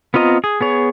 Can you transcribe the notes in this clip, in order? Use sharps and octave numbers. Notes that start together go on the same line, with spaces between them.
B3 C4 F4 D#5 A#5
G#4
B3 G#4 C#5